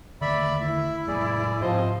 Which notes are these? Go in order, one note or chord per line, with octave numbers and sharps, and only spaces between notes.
D3 D#3 A3 D5 E5 B5
E4 E5
A2 F#3 G#3 G#4 D5
G#2 C3 F3 C5 D#5